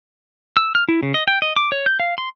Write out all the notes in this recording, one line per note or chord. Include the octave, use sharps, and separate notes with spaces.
E6
F6
E4
C#3
D#5
G5
D#5
D6
C#5
G6
F5
C6